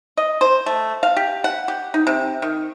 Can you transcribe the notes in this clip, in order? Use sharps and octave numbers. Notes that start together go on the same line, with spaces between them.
D#5
C5
A3
F5
G4
F#5
G4
D#4
C3
D#3